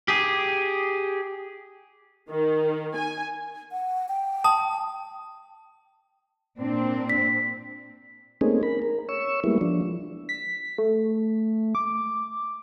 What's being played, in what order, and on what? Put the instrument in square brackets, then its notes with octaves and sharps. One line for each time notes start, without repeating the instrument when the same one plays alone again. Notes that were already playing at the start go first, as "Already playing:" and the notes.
[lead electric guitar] G4 G#4
[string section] D#3
G#5
[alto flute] F#5
G5
[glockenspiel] A5 [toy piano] D#6
[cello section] A#2 C4 D4
[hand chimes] B6
[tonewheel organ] A3 A#3 C4 C#4 D#4 G#4
A#4 B5
A#4
C#5 C#6 E6
G3 G#3 A#3 B3 E4
F3 D4
[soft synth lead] B6
A3
D6